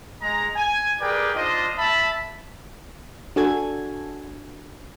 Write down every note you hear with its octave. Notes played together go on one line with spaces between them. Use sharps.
G#3 A#5
G#5
G4 G#4 A#4 B4 D5 G5
D4 D#4 F4 C5 D#5
E5 A5 B5
D4 F#4 A4 G#5 G#6